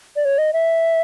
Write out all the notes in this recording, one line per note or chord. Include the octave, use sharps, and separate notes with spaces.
D5
C#5
D#5
E5